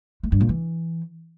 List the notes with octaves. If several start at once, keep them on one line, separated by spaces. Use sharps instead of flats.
A3
G2
A#2
E3